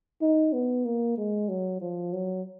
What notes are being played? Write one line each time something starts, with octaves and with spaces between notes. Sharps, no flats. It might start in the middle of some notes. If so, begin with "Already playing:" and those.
D#4
B3
A#3
G#3
F#3
F3
F#3